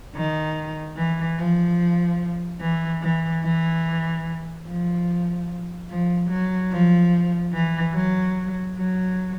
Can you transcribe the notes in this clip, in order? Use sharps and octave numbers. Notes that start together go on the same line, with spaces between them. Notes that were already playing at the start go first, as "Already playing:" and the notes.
D#3
E3
F3
E3
E3
E3
F3
F3
F#3
F3
E3
F#3
F#3